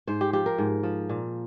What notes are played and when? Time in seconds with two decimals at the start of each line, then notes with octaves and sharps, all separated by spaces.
0.07 G#2 C5
0.21 G4
0.33 F3 G4
0.46 A#4
0.58 G#2
0.83 F3
1.10 A#2